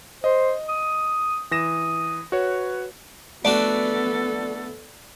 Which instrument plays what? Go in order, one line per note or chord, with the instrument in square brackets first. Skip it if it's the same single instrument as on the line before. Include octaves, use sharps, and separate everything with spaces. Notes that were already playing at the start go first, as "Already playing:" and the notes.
[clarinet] C5 [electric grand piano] D#5
[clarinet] D#6
[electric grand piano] E3 A#6 E7 [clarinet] D#6
[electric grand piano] F#4 C#5 [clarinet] B4
[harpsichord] A3 D4 F#4 [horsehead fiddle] B3 A4 [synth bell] D5